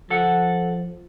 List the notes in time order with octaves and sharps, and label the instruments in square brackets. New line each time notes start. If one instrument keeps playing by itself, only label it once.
[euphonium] F3 [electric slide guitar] A4 F#5